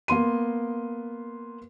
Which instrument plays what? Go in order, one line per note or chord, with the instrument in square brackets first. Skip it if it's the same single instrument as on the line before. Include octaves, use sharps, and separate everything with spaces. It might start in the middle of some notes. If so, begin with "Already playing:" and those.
[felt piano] A#3 B3 C6 D#7